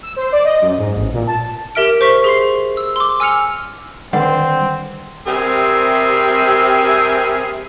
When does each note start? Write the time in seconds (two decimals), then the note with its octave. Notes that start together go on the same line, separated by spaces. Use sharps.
0.03 E6
0.16 C5
0.32 D5
0.45 D#5
0.62 F#2
0.78 G#2
0.95 A1
1.14 A#2
1.27 A5
1.75 G4 A#4 E5 F6 D7
2.01 C5 C#6 B6
2.24 G#4 C6 C7
2.77 E6
2.96 C6 D6
3.20 G#5 E6 F6 C#7 F7
4.13 D3 D#3 G3 C4 D4 A4 D5 F#5
5.27 C3 G3 C4 G#4 A#4 E5